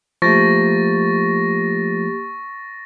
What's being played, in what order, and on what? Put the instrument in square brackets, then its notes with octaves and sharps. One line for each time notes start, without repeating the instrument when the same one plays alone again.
[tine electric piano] F3 A3 [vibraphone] A#3 G4 [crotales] C#6 A6 A#6